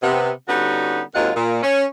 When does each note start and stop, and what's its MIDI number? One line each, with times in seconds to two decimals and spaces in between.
0.03 0.30 48
0.03 0.30 59
0.48 1.02 50
0.48 1.02 55
0.48 1.02 59
0.48 1.02 61
0.48 1.02 63
0.48 1.02 66
1.15 1.30 39
1.15 1.30 54
1.15 1.30 56
1.15 1.30 60
1.15 1.30 65
1.15 1.30 78
1.36 1.57 46
1.63 1.84 61